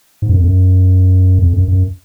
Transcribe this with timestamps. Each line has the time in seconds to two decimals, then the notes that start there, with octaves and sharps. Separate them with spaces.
0.22 G#2
0.29 F#2
0.37 F2
0.44 F#2
1.39 F2
1.53 F#2
1.68 F#2